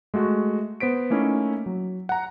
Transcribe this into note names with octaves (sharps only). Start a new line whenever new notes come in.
G#3 A3 F#4
B3 C5 B6 D7
A3 A#3 C#4 D#4 E4
F#3
F#5 A#5